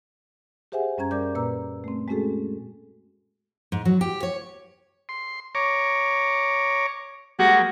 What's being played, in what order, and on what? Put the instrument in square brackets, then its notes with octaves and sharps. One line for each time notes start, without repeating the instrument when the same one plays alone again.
[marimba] G4 G#4 C5 E5 F#5 G#5
F#2 G3 C#4 A#5 G#6
G3 A#4 D5 D6 G6
A#2 A#3 B4 A#5 E6
A3 C4
G#3 A3 C#4 F#4 G#4 A4
[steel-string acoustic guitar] G#2
F#3
G4
C#5
[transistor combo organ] C6
C#5 A#5 D6
[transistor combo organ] G3 G#3 A#3 [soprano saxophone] F#4